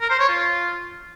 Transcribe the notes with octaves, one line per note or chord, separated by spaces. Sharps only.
A#4
C5
C#5
F4